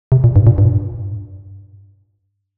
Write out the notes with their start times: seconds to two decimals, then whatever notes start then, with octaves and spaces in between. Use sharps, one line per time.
0.12 C3
0.24 A#2
0.36 G2
0.47 A#2
0.58 G2